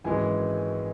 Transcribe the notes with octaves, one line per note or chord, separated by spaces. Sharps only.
G#1 F#2 E3 G#3 G#5